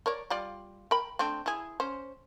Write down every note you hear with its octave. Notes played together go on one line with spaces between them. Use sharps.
A#4 C#5 D5
G3 F4 D5
A#4 G5 B5
A3 C4 D4
E4 G#4
C#4 C5